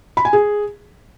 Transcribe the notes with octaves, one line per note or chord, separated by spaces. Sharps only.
B5
G#5
G#4